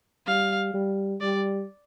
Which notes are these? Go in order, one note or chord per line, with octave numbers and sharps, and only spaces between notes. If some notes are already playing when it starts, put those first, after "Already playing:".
G3 F5
G3
G3 D5